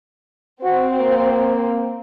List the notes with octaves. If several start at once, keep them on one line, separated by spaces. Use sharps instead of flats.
C4 F#4
A#3